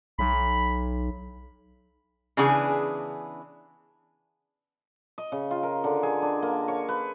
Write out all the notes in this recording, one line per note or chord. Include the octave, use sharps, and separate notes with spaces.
B1 B5
C#3 E3 B3 D4 G#4
D#5
C#3
F4
A#4
D3
G#4
D4
A#3
C#5
B4